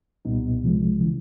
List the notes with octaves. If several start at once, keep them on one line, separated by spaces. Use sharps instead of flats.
C2 A#2 G3 B3 D#4
C2 C3 F3 G#3
C#3 E3